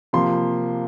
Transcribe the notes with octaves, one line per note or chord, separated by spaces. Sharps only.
C3 F3 A#3 C6